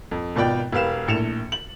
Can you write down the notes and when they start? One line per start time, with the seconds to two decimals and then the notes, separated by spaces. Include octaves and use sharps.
0.11 F2
0.36 G#1 B2 F4 D5 G5
0.72 E1 G4 B4 F5 E7
1.08 A#1 A2 C#7 E7 F7
1.52 F#7